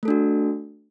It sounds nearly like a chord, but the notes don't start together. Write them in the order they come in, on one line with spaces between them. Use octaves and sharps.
A3 A4 D4 F#4